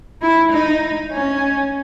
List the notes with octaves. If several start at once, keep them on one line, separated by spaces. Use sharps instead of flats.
E4
D#4
C#4